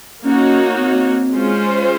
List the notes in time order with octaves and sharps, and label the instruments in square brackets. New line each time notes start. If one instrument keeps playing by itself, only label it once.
[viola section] A#3 D#4 F#4 C#5 [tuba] C#4
[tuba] C4
[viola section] G#3 C#4 F4 C5